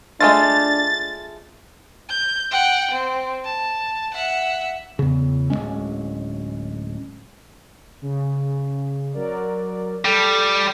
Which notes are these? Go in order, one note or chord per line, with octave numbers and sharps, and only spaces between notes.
G#3 A3 D4 F4 A6
G6
F#5 G5
C4
A5
E5 F#5
E2 C#3
D1 D#2 G#3 C#4
C#3
F#3 A#4 D5
G3 A4